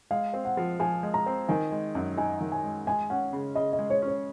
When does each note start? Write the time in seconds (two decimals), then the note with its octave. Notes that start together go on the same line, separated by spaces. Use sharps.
0.11 G#3 F5
0.33 C4
0.45 F#5
0.57 F3
0.80 F3 G#5
1.03 G#3
1.14 A#5
1.26 C4
1.48 D#3 G#5
1.71 G#3
1.95 F#2
2.17 D#4 G#5
2.41 D#3
2.52 G#5
2.64 G#3
2.87 G#3 G#5
3.10 C#4 F#5
3.33 C#3
3.55 C#3 D#5
3.73 D#5
3.79 G#3
3.90 C#5
4.02 C#4
4.07 C#5